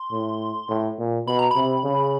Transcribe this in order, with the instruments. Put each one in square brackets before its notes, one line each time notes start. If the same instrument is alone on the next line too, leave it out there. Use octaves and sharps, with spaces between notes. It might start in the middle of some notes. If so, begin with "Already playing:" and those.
Already playing: [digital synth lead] C6
[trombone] A2
A2
A#2
[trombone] B2 [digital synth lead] B5
[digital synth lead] A#5
[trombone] C3 [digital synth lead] B5
[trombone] C#3